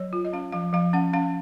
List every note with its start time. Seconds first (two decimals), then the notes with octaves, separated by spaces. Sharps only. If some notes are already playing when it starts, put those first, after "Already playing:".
Already playing: F#3 C#5
0.13 F4
0.25 D#5
0.33 C#4 F5
0.52 F3 F5
0.73 F3 F5
0.93 C#4 F#5
1.13 C#4 F5